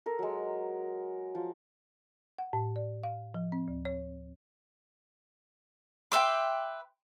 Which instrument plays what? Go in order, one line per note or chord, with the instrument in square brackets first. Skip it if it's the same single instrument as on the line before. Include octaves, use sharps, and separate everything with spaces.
[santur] A4 A#4
F#3 G#3
F3
[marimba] F#5
A2
D5
F5
F3
C4
D2
C#5
[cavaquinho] B4 E5 D6 [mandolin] G5 C6